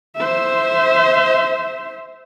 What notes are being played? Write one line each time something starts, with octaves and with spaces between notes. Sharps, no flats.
C5 E5